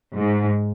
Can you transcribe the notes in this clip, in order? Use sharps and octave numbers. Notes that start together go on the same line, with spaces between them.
G#2